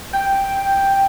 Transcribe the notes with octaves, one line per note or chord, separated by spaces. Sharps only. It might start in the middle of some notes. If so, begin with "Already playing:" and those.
G5